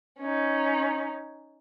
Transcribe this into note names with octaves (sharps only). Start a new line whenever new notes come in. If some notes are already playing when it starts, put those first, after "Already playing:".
C#4 D#4